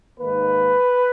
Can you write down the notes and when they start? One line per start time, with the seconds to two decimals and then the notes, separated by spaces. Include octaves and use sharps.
0.20 G#2 D#3 A#3 B4